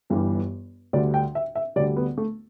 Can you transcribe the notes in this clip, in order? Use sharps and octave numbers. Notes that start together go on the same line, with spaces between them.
G1 G2 E3 G3
D2 D3 G3 D5
G5
E5
E5
D2 D3 G3 D5
B3
A3